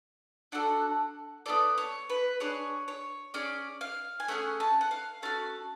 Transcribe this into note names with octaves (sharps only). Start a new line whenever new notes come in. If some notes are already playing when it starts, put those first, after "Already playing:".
D4 F#4 A4 F#5
B3 F4 A4 D5
C#5
B4
D4 G#4 C#5
C#5
C#4 G#4 D5
F5
G#5
A3 C#4 G#4 F#5
A5
F#5
F5
A3 C#4 F#4 A5